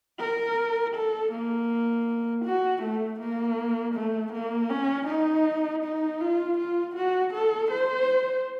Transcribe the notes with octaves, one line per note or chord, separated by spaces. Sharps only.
A#4
A4
A#3
F#4
A3
A#3
A3
A#3
C#4
D#4
D#4
F4
F4
F#4
A4
C5